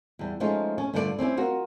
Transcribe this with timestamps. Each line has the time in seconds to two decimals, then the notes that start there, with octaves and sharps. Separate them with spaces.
0.19 E2 G3
0.40 F3 G#3 A3 C#4 D#4 F4
0.78 C#4
0.93 G2 D3 A3 F4 A#4 D5
1.18 C4 C#4 E4 G4
1.37 F4 F#4 A#4